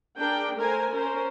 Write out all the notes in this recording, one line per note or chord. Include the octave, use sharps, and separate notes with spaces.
D4 G#4 A#4 G5
A3 A#4 C5 G#5
C#4 A#4 C5